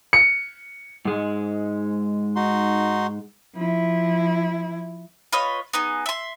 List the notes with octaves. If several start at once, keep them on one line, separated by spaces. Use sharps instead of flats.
C#7
G#2 G#3
D#4 F#4 C6
F3 E4
F4 B4 C#5 D#5
B3 D#4 G#4
E5 C6